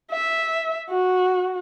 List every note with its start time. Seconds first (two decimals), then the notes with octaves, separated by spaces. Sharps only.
0.11 E5
0.90 F#4